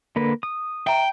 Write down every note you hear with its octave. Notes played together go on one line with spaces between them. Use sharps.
D3 A#3 B4
D#6
E5 G5 A#5